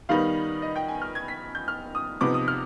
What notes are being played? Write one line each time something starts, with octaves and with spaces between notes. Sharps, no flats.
D#3 G3 B3 D#4 F5
D#5
G5
G#5
F6
G#6
B6
G6
F6
D#6
C3 F3 B3 D#4 D6
D#6
F6